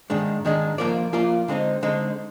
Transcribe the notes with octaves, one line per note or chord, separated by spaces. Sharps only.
G#2 D#3 G#3 D4
G#2 D#3 G#3 D4
F3 A#3 F4 A#4 D5
F3 A#3 F4 A#4 D5
D3 G#3 C4 D#4
D3 G#3 C4 D#4